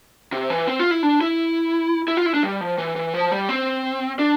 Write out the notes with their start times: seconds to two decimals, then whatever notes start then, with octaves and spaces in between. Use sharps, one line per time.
0.32 C3
0.50 E3
0.67 C4
0.80 F4
0.91 E4
1.03 D4
1.21 E4
2.08 E4
2.17 F4
2.26 E4
2.34 D4
2.43 G3
2.61 F3
2.78 E3
2.96 E3
3.14 F3
3.32 G3
3.49 C4
4.19 D4